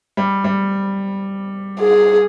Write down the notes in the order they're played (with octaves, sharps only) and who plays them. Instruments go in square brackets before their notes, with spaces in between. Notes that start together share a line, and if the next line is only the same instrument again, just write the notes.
[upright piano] G3
G3
[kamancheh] G#4